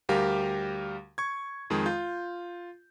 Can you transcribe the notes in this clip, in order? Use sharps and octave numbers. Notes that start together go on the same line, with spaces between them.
D2 G3 G4 A#4 F5
C#6 G#6
F2 D#3 G#3
F4 G6